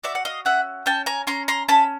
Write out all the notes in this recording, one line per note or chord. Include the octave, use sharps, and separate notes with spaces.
F#4 D5 E5
F#5
D#5 F5
C#4 E5 F#5
C#4 G5 A5
G#5 A#5
C#4 A#5 C6
A#5 C6
C#4 A5 B5